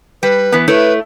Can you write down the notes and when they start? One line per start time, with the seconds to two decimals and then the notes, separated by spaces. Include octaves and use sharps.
0.23 G3 B4
0.52 E3 B3
0.68 A3 E4 B4 C#5